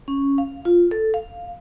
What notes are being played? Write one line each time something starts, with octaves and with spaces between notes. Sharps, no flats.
C#4
F5
F4
A4
F5